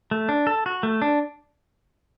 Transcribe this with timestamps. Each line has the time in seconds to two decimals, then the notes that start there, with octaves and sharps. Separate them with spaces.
0.11 A3
0.29 D4
0.47 A4
0.66 F#4
0.83 A3
1.02 D4